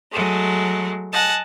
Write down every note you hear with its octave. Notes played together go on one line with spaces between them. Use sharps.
F#3 G#3 A3
D#5 F#5 G#5 A5